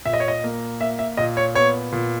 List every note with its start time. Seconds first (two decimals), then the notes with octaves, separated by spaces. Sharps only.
0.06 A#2 E5
0.13 D#5
0.20 C#5
0.28 D#5
0.44 A#3
0.80 A#3 E5
0.99 E5
1.17 A#2 D#5
1.37 C#5
1.55 B3 C#5
1.92 A#2